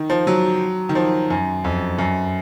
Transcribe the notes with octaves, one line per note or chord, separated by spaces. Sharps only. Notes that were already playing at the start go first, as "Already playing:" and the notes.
Already playing: D#3
F3
F#3
D#3
F3
F#2
F2
F#2